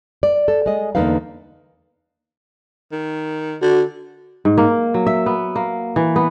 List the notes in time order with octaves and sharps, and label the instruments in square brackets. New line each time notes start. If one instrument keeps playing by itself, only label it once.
[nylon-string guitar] D5
A4
G#3 D#5
E2 D3 A#3 D#4 B4 F5
[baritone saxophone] D#3
[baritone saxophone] D3 [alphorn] F#4
[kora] G#2
A#3
F#3
E5
B3
A#3
E3
B3